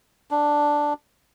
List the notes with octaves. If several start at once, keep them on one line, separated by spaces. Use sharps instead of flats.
D4